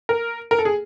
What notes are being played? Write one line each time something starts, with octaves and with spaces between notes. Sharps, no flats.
A#4
A#4
A4
G#4